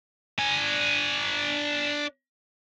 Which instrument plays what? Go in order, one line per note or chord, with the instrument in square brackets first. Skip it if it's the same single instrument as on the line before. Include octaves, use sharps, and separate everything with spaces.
[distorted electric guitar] D4 G#5